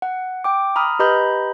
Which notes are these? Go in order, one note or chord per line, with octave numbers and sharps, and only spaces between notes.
F#5
G5 D6
A#5 B5 D#6 F6
G4 B4 D#5 A#5 B5 G6